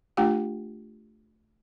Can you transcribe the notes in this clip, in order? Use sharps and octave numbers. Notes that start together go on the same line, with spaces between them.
A3 D4 F4 G4 G5